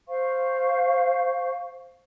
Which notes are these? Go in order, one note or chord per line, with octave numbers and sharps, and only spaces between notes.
C5 F5 C#6